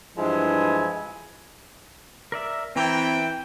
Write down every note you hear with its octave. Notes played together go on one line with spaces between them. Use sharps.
G2 E3 F3 G#3 E4 G#5
A#4 D5 E5
E3 C4 G5 A#5